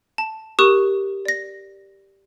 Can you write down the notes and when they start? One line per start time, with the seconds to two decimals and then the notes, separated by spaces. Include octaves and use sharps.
0.18 A5
0.59 G4 A#4 C#6 D#6 F#6
1.25 D5 A#6